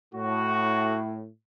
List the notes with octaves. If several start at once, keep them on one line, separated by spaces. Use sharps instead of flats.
A2 F#4